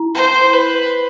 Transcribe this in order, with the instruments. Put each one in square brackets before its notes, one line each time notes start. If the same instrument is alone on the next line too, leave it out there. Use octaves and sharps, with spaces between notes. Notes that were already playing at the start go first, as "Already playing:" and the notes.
Already playing: [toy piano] E4
[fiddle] C5
B4